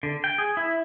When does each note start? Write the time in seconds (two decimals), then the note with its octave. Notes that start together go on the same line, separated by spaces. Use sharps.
0.03 D3
0.24 G5
0.38 G#4
0.57 E4